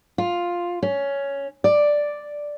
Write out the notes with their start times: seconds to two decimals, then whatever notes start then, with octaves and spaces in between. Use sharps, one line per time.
0.18 F4
0.82 C#4
1.64 D5